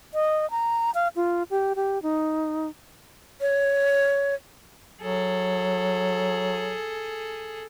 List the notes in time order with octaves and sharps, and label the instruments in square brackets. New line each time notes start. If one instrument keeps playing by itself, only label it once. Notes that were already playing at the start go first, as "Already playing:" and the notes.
[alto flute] D#5
A#5
F5
F4
G4
G4
D#4
[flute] C#5
[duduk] F#3 [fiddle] G#4 A4